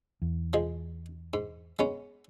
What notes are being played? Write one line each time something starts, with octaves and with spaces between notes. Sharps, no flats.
E2
F3 G#3
G#2
G#3 B3 C#4